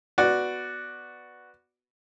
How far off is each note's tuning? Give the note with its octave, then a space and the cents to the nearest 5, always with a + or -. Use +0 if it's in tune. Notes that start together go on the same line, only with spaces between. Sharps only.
B3 +0 F#4 +0 D5 +0